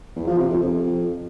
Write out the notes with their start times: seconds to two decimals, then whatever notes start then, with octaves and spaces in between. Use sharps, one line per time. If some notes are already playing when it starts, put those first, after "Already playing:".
0.16 E2
0.27 F3
0.38 C3
0.50 F2
0.61 F2